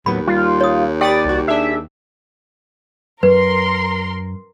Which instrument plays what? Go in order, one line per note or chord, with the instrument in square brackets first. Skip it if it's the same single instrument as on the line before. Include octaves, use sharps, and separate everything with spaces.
[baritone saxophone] D#2 [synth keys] A2 F#3 B3 [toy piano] B5
[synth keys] G3 [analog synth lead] F4
[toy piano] C#5 D#6
[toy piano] G4 G5 [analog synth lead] D5 [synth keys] B5 D#6 A6
[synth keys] C2 F#4
[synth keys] D4 G#4 [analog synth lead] E5
[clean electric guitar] F#2 [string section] A#4 C6 [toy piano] B4